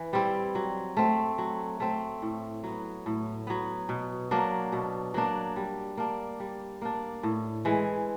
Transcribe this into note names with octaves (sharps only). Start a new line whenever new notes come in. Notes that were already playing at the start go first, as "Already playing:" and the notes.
Already playing: E3
G3 C4 E4
F#3
A3 C4
F#3
A3 C4
A2
F#3 B3
A2
F#3 B3
B2
F#3 A#3 D4
B2
F#3 A#3 D4
G3
A#3 D4
G3
A#3 D4
A2
E3 G#3